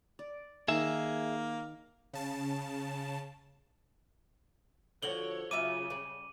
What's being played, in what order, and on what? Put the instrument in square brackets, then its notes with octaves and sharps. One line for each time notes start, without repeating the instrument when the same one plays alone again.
[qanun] D5
[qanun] D#3 C6 [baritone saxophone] A#3 [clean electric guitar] G#4 E5
[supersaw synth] C#3 A5
[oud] D3 F3 F#4 [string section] C#5 [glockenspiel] F#7 G7
[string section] C#3 [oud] F#3 F4 E5 [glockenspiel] D6 D#7
[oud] G3 D5